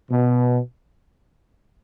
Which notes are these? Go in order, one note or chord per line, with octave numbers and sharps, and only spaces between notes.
B2